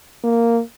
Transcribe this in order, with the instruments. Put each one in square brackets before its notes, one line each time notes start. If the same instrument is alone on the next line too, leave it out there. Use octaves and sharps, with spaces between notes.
[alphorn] A#3